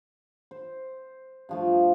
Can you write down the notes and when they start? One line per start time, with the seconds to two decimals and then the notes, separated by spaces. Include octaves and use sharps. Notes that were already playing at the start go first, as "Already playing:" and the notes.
0.51 C5
1.49 G2 F3 A3